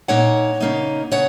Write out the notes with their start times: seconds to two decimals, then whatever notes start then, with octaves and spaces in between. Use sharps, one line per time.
0.08 A#2 A#3 D#4 C#5 F#5
0.60 C#3 A#3 D#4
1.12 C#3 C#5 F#5